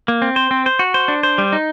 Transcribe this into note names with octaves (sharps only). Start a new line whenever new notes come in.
A#3
C4
C5
C4
C5
F#4
C5
D4
C5
G3
D#4